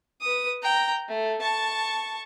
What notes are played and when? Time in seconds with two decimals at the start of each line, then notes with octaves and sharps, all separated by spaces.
0.21 B4 D#6
0.62 G5 A#5
1.08 A3
1.41 A5 C#6